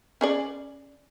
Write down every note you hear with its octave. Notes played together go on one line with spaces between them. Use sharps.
C#4 G#4 D5